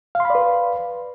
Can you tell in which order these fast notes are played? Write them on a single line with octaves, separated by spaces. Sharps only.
F5 C6 B5 D5 B4